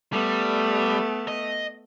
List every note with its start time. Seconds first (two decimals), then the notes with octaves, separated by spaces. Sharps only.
0.13 G3 A3 B3
1.28 D#5